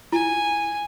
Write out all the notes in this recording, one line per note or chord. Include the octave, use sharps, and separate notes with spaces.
E4 G#5